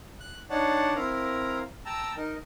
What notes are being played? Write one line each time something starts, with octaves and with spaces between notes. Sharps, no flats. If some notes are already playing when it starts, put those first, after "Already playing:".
F#6
D4 D#4 C#5 D5 F#5 A5
C4 E4 A#4 F5 A#5
G5 A5 A#5 E6
D#4 A#4